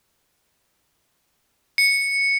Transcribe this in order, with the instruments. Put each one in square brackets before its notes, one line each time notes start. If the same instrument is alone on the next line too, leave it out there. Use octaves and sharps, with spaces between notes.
[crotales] C#7